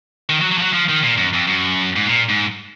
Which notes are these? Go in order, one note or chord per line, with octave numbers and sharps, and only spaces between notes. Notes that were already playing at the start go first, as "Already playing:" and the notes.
D#3
F#3
F#3
F3
F#3
F3
D#3
A#2
F#2
F2
F#2
G#2
A#2
G#2